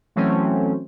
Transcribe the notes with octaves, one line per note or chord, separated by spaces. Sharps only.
E3 F#3 A3 C4 C#4